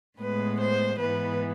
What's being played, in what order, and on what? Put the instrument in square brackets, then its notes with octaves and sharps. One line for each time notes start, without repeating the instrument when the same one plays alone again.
[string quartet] A2 G#3 B3 B4
C5
G#2 E3 B3 B4